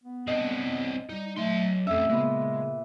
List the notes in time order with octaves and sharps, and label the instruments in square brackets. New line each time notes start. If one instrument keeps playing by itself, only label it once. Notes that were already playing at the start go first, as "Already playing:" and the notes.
[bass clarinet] B3
[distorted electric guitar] C4 D4 [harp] D#5
[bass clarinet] G3 [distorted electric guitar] D#4
[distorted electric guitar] F#3 C6 [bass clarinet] A3
[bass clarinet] F2 [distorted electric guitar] A3 C#4 [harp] E5
[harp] A#2 B3 [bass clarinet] C#3 [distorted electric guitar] G#3